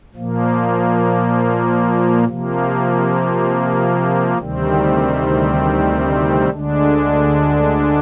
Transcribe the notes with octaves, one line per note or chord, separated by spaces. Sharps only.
A#2 F3 A#3
C3 F3 A#3
D2 C3 D#3 G3 C4
D2 D3 G#3 D4